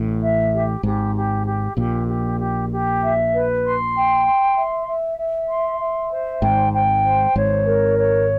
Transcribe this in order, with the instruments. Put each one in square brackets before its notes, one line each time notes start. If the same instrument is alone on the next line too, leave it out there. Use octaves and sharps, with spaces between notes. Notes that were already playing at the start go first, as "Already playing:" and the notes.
Already playing: [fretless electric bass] A1 A2
[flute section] E5
G4
[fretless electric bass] G#1 G#2 [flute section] G4
[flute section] G4
G4
[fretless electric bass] A#1 A#2 [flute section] G4
[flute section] G4
G4
G4
E5
B4
C6
G5
C6
E5
E5
E5
C6
E5
C5
[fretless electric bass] G#1 G#2 [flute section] G5
[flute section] G5
C5
[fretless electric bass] G#1 G#2 [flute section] C#5
[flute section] A#4
C#5